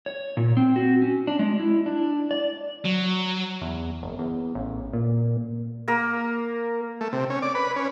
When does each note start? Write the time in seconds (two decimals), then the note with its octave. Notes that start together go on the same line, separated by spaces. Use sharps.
0.06 C#5
0.37 A#2
0.57 C4
0.76 F#4
1.02 C#4
1.27 D4
1.39 G#3
1.60 E4
1.86 D4
2.31 D5
2.84 F#3
3.62 E2
4.02 F#1
4.19 E2
4.55 A1
4.93 A#2
5.88 A#3 A#4
7.01 A3
7.13 C3
7.30 C#4
7.42 D5
7.55 B4
7.76 C#4